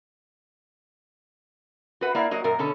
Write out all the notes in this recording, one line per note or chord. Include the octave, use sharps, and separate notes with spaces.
F#4 B4 F#5
A#3 E4 D5 F5 F#5
F#3 A#3 F#4 D#5
F#2 A#2 A#4
B2 D3 C#4 A4